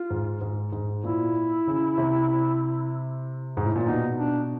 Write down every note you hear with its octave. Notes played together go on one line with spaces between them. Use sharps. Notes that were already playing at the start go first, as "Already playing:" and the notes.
Already playing: F4
G#2
G#2
G#2
A#2 E4
C#3
C3
G#2
A2
A#2
B2 D#4
D4